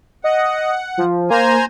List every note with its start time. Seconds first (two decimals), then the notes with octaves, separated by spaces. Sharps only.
0.24 D#5 F#5
0.97 F3
1.30 A#3 C5 G#5 A#5